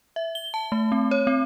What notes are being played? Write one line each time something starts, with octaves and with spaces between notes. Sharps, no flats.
E5
G7
A5
A3
C4
C#5
C4